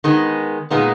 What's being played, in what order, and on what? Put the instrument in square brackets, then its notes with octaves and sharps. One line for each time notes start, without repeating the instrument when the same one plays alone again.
[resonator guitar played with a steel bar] D#3 G#3 B3
A#2 G#3 B3 D#4